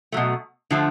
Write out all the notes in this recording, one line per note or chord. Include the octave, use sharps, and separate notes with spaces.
B2 F#3 A3
D3 F3 A3